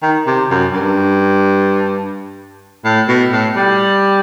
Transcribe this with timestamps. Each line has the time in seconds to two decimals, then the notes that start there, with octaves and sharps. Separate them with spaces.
0.03 D#3
0.27 C3
0.50 F#2
0.74 G2
2.85 A2
3.08 B2
3.32 A2
3.56 G3